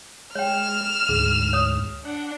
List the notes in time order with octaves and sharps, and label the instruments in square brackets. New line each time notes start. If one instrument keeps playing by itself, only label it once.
[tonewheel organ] G#3 [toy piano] C#5 G5 [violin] F6 E7
[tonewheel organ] D2 G#2 [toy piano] G#4
[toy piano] C#5 D#6
[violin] D4 [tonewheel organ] F#5